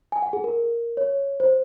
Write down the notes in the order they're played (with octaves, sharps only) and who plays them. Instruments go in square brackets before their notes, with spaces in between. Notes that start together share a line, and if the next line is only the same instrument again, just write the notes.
[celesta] G#5
F#5
G#4
A#4
C#5
C5